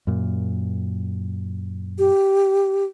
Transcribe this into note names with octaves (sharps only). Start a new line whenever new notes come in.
F#2 A#2
G4